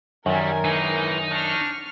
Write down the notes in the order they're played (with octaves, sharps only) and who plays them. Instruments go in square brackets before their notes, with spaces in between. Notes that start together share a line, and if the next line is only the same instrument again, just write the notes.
[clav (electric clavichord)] F#2 D#3 [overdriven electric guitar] F#3 G3 [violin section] A#4 G#5
[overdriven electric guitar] E3 G#3 [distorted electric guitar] D#4 D#5
[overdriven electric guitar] D4 [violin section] C#6 F6